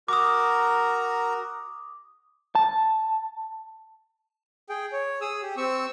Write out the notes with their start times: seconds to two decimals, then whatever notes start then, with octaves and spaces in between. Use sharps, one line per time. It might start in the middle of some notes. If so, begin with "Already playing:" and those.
0.08 F#4 A#4 A#5 D6 D#6
2.55 A5
4.69 G#4 G5
4.92 C#5
5.21 G#4 D#6 E6
5.43 G4
5.57 C4 C#6 E6